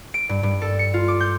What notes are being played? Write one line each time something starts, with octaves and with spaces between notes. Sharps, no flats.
D7
G2
G2
A4
C#7
F4
D6
G6